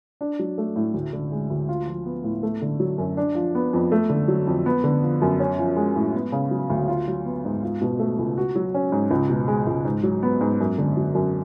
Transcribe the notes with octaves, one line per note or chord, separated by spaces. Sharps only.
D4
F#3
A3
A2
D2
D3
G#3
D2
F4
F3
B3
A2
A3
D3
F#3
F#2
D4
F3
B3
F2
A3
D3
F#3
F2
B3
D3
F3
F#2
C#4
F3
G#3
A2
B3
C#3
F#3
D2
F4
F#3
B3
G#2
F4
B2
A3
C#2
F#4
F#3
C#4
G#2
C#2
B2
G#3
C#2
G#2
F#3
B3
G#2
F#2
D3
F#3
F#2